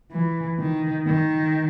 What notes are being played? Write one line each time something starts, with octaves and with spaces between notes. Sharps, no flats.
E3
D#3
D#3